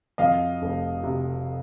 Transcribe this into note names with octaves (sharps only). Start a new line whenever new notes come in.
F2 D#5 F5
F1
C3